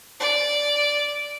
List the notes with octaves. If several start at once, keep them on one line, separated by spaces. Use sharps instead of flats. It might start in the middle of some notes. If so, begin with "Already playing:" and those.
D5